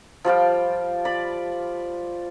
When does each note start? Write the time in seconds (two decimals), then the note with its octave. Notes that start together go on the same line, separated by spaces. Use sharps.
0.25 F3 G3 F4 G5
1.05 D5 B5